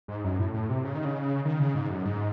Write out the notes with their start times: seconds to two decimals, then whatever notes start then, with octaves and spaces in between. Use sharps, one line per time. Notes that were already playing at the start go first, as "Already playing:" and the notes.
0.08 G#2
0.24 F#2
0.39 A2
0.54 A2
0.69 C3
0.84 C#3
0.95 D#3
1.05 C#3
1.45 D#3
1.60 C#3
1.75 G#2
1.90 F#2
2.05 G#2